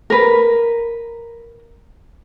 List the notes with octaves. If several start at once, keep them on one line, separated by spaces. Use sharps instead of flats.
A#4 B4